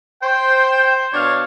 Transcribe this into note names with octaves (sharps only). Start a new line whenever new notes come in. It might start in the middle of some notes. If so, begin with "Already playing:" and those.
C5 G5
B2 D4 C#5 F5